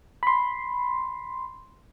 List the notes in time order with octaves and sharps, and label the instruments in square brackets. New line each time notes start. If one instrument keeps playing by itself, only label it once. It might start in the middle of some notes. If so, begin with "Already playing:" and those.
[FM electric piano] B5 C6